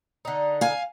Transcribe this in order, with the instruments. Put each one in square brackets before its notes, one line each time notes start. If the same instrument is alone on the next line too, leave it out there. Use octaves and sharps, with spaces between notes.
[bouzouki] D3 D#4
[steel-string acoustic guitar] F5 G#5